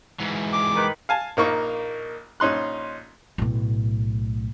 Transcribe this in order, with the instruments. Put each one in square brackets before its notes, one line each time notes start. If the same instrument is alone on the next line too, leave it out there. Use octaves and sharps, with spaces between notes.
[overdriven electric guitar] G#2 E3
[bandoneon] D6
[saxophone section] D#3 B4
[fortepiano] F5 G#5 A5
A#1 A#3 D#4 C#6
A#1 C#4 D#4 C6 F#6
[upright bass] B1 A2